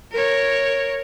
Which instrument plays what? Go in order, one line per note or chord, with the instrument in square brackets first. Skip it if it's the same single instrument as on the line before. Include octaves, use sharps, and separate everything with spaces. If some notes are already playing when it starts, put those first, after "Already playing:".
[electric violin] A#4 C#5